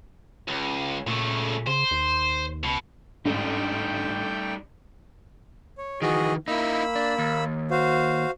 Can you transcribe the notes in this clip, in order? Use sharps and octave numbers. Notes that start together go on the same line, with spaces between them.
C#2
A#2 C#3 A3
C#3 C5
D#2
C#2 B2
A1 G#2 D3 G3 A3 D#4 G5
C#5
D#3 E3 F#4 G#4 D#5
A#3 D#4 E4 B5 E6
D4
D#2
F#4 C5 F5